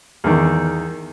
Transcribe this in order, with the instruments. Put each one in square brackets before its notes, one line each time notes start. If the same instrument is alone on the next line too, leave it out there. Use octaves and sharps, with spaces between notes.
[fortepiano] E2 D#3